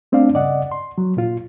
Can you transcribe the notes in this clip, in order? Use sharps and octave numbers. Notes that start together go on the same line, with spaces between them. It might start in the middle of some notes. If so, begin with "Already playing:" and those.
A3 C4 D4 D5 F5
G2 C#3 D5 D#5 F#5
C6
F#3
A#2 F4